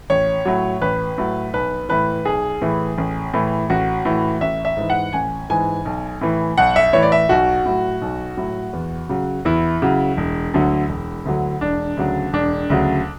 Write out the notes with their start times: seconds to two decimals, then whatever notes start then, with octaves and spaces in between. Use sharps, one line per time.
0.10 A1 C#5
0.45 A2 F#3
0.81 A1 B4
1.18 A2 F#3
1.53 B1 B4
1.89 A2 E3 B4
2.25 B1 G#4
2.61 A2 E3
2.98 A1
3.34 A2 E3
3.70 A1 F#4
4.05 A2 E3
4.41 A1 E5
4.65 E5
4.77 G#2 E3
4.90 F#5
5.13 A1 G#5
5.50 G#2 E3 G#5
5.85 B1
6.21 A2 E3
6.58 B1 F#5
6.76 E5
6.93 A2 E3 C#5
7.02 D5
7.12 E5
7.29 B1 F#4
7.65 A2 F#3
8.01 B1
8.37 A2 F#3
8.73 E2
9.09 C#3 F#3
9.45 E2 E4
9.82 C#3 F#3
10.17 E1
10.54 D2 D3 F#3
10.89 E1
11.25 D2 D3 F#3
11.61 E1 D4
11.97 D2 C#3 F#3
12.33 E1 D4
12.70 D2 C#3 F#3